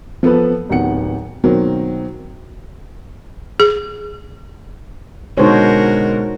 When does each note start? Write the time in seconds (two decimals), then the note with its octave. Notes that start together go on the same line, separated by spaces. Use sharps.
0.23 F3 B3 A4 B4
0.69 D1 C3 D#3 B3 F#5 C#7
1.44 B2 D#3 F#3 A#3 C4
3.60 G#4
5.38 B2 D3 G#3 D#4 F#4 A#4 C5 C#5